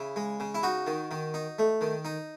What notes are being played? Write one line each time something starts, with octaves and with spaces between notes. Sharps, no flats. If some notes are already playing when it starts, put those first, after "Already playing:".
Already playing: C#3 E4
G#3
C#3
E4
D#4 F#4
D#3
D#3
D#4
A3
D#3
D#4